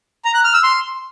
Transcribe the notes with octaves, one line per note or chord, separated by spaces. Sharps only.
A#5
F#6
F6
E6
C6